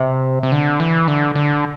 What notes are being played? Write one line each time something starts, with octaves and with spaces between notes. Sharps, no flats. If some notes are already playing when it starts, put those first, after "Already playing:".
Already playing: C3
C3
D3
E3
D3
D3